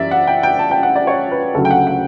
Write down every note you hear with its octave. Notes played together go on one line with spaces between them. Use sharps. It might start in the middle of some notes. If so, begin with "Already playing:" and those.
Already playing: F#2 E3 G3 D5 E5
F#5
G5
G5
A5
G5
F#5
D5
C#5
B4
D2 C#3 F#3 A4
G5
F#5
F#5